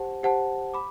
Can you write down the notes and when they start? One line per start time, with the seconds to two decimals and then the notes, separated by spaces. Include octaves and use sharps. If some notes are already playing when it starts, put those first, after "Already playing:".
Already playing: G4 C5 F#5 A5
0.23 G4 C5 F#5 A5
0.74 B5 D6